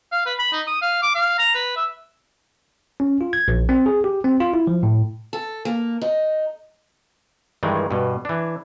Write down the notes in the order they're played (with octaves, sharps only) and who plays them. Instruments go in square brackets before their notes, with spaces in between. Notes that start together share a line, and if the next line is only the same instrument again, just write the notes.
[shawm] F5
B4
B5
D#4
D#6
F5
D6
F5
A#5
B4
E5
[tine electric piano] C#4
F4
G#6
A#1
C4
G#4
G4
C4
F4
E4
F3
A2
[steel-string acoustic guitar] A4
A#3
D#4
[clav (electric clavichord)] G2 D#3 E3 G#3
G2 B2
E3 D4